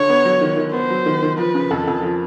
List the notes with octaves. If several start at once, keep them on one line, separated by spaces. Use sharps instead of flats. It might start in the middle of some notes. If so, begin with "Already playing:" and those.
Already playing: D3 C#5
B3
F#3
D#3
D#3
B3 C5
F#3
D#3
D#3
F3 B4
C#3
F2 A4
F2
F3